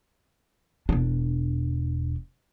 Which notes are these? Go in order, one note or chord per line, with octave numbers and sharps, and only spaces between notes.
E1 D4